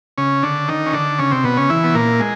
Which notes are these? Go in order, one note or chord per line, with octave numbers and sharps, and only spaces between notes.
C#3 C#4
D3 D4
D#3 D#4
C#4
D3 D4
C#3 C#4
C3 C4
B2 B3
C#3 C#4
E3 E4
B3
A#2 A#3
G#3